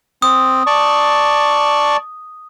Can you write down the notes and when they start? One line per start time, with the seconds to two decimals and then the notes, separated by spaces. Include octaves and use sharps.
0.22 C4 D#6
0.67 D5 A5 C#6